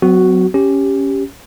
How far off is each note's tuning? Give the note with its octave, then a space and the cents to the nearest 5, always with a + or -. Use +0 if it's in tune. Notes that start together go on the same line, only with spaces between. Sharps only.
F#3 +0 C4 -45 F#4 +0
C#4 +0 G4 +0